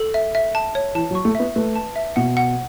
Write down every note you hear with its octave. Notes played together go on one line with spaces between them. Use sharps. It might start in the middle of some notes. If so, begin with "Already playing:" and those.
Already playing: A4
E5
E5
A5
C#5
E3 A5
F#3
C#6
A3
E5
B3
A3 B4
A5
E5
B2 F#5
F#5